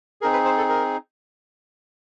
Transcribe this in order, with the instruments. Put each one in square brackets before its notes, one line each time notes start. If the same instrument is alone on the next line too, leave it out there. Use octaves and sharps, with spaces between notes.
[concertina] C4 D#4 G#4 A#4
B4
C5
A4
A#4